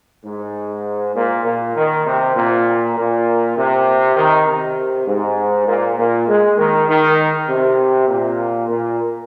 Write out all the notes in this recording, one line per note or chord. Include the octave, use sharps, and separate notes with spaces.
G#2
A#2
A#2
D#3
C3
A#2
A#2
C3
D#3
C3
G#2
A#2
A#2
G#3
D#3
D#3
C3
A#2
A#2